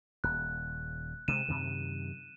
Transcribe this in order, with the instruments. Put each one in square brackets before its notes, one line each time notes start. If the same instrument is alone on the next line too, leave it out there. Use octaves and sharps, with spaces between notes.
[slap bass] D#1 [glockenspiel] F#6
[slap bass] C3 G#3 C4 [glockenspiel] D#7 E7
[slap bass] F#2 C3 D#3